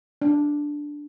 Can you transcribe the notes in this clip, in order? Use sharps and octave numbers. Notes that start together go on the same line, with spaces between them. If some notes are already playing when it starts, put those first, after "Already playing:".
D4